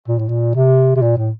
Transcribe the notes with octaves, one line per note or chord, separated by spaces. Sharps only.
A#2
A2
A#2
C3
C3
A#2
A2